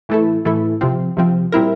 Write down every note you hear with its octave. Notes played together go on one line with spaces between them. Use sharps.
A2 E3 A3 E4 A4
A2 E3 A3 E4 A4
C3 F3 C4
C3 F3 C4
A#2 G3 C4 E4 A#4